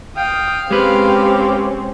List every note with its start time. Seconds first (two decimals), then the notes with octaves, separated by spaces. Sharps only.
0.17 F5 G5 D#6
0.71 G#3 C4 C#4 G4 B4